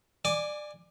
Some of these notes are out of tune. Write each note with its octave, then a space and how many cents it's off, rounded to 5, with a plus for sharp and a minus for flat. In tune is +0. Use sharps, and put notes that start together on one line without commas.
D5 +25 G#5 -5 D6 +0